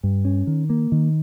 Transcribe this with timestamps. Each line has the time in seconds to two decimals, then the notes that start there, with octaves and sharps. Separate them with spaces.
0.03 G2
0.25 C#4
0.47 D#3
0.70 A#3
0.92 D#3